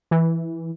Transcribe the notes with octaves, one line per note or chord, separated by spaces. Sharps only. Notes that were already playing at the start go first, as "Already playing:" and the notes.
E3